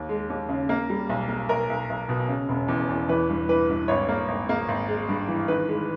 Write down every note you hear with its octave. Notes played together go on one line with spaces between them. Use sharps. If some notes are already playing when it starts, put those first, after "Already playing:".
Already playing: D#2
G#3
D#2
C#3
A#3
G3
B1
A#3
B1 A#4
B1
B1
B2
C#3
E1
E2
E2
E3 B4
G2
E3 B4
G2
G#1 C#5
A#3
G#1
A#3
G#1
G#3
G2
E3
D#3 B4
G#3